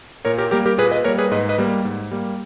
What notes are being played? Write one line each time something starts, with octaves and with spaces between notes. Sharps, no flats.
A#2 A#4 C#5
G4 A#4
G3 A#3 G4 A#4
G4 A#4
A#2 G#4 B4
B4 D#5
G3 A#3 A#4 C#5
G#4 B4
G#2 B4 D#5
B4 D#5
G3 A#3
G#2
G3 A#3